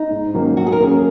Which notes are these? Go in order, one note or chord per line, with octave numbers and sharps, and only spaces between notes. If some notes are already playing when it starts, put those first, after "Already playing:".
Already playing: D#4
G#2
D#3 F#3 A#3 C#4
F#3 F#4
G#4
A#4
A#3 C#4 G#4